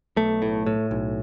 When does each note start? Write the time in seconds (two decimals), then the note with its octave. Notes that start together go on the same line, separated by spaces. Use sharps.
0.16 B1 A3
0.42 A2
0.66 A2
0.91 B1